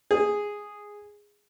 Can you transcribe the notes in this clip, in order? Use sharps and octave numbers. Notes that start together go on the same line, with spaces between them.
G#4